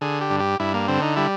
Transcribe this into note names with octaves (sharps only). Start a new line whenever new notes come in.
D3 G#4
G4
G2
G4
G2 E4
A#3
D3 C4
D#4
G3 E4